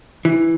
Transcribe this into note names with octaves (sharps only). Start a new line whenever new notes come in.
E3